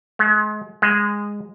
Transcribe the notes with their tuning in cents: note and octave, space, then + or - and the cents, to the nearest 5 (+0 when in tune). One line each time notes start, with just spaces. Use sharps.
G#3 +35
G#3 -10